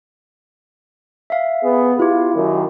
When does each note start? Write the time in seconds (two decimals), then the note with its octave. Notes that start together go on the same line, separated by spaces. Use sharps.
1.30 E5 F5
1.64 B3 G#4
1.99 E4 F4 G4
2.35 F#2 D#3